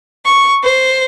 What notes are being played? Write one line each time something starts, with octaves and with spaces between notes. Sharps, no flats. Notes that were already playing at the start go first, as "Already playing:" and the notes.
C#6
C5